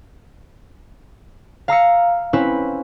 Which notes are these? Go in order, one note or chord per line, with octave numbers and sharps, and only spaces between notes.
F5 A#5 E6 C#7
C4 C#4 E4 B4